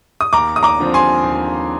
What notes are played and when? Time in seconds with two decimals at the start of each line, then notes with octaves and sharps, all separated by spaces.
0.21 D#6
0.33 D#2 A#5 D6
0.56 D#6
0.63 A#5 D6
0.79 D3 F3 C4
0.94 G#5 C6
1.23 D#2